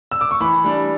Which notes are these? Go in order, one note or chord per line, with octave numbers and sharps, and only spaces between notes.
E6
D6
C#6
E3 B5
G3 D4